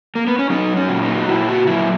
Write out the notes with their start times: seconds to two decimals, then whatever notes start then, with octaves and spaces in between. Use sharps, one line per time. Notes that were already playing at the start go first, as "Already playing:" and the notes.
0.15 A#3
0.27 B3
0.39 C#4
0.50 F#3 D#4
0.77 C#4
0.89 A#2
1.03 D#4
1.17 F#4
1.29 A#2 E4
1.49 F#4
1.67 F#3 E4